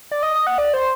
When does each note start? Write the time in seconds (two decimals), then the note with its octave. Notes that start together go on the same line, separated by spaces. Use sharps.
0.11 D5
0.23 D#5
0.35 D#5
0.47 F#5
0.58 D5
0.73 C5